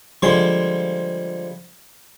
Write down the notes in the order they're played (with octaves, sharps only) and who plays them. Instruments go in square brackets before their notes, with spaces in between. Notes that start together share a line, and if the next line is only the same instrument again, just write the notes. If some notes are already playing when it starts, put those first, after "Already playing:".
[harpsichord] D3 F3 G3 G#3 G#5 C6